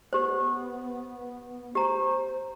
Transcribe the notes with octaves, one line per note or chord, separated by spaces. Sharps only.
B3 G4 C5
G4 C5 A#5